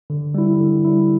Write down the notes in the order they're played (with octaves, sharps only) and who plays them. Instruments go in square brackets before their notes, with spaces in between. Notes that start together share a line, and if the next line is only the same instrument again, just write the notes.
[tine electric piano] D3
G3 E4
D3
G3 E4